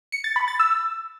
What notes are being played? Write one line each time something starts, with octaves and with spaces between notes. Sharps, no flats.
C#7
A6
B5
A6
E6